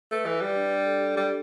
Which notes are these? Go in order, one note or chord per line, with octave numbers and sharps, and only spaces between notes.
A3 B4
E3
G3 G4
D4
D4
A4
G4
G3 G4